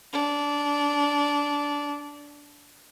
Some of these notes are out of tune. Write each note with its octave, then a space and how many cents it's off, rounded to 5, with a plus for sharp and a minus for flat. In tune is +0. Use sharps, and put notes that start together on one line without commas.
D4 -20